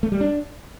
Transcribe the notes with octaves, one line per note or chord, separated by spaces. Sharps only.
A3
G3
D4